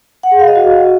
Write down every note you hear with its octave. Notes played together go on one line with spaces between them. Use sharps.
F#5
G#4
F5
D#5
F#4